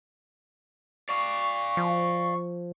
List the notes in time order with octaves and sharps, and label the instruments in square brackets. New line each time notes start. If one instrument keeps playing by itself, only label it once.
[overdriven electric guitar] D5 F5 [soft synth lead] C#6
[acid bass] F3